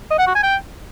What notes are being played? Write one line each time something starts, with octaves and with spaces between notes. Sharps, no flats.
D#5
F#5
F#4
G#5
G5